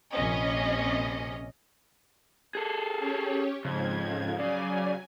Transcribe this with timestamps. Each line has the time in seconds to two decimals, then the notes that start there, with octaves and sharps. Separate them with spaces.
0.13 A#1 C3 C#4 D#5
2.55 G#4 A4 C7
3.00 C#4 G4 C#5
3.65 F2 G#2 C#3 F3 G#6
4.39 C#3 F#3 D5 G#5